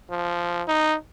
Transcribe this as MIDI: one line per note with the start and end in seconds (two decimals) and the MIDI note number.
0.10 0.63 53
0.68 0.96 63